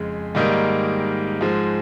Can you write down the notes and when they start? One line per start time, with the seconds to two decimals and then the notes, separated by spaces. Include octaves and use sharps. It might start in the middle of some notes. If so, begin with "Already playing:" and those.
Already playing: F2 C#3 G#3
0.35 G#2 D#3 G3 A#3 D#4
1.41 G#2 F3 G#3